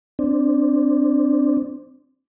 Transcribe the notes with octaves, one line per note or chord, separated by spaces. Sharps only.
C4 D4